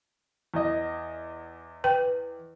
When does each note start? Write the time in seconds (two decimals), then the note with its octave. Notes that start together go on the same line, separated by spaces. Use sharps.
0.54 E2 D#5
1.84 B4 G5